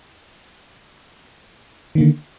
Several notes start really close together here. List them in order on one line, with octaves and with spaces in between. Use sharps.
D#3 A#3 D3